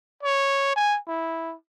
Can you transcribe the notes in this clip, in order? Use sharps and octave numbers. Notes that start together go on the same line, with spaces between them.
C#5
G#5
E4